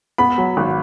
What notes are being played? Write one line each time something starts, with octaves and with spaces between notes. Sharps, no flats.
B3 B5
F#3
G#1